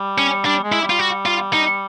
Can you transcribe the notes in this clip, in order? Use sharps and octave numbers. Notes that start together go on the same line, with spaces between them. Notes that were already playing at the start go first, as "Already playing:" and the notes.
Already playing: G3
C#4
G3 D4
G#3
E4
G3
F4
F#4
F4
D#4